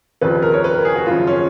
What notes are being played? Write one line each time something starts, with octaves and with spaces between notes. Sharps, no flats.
F1 D#2 C#3 F3 B4
A#4
C#5
B4
A#4
G#4
F#4
G#1 F#2 C#3 F3 F4
C#4